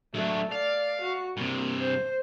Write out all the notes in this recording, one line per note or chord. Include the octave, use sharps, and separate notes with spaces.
F#3 A3 D4
D5 F5
F#4
G2 C3 A#3
C5